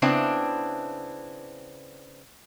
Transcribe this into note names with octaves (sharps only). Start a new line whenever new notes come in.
C#3 B3 C4 D4 E4